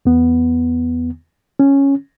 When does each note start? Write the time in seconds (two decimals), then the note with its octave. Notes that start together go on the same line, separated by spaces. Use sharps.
0.05 E2 B3
1.60 C#4